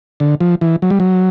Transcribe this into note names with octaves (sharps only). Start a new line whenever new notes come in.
D3
F3
E3
F#3
G3
F#3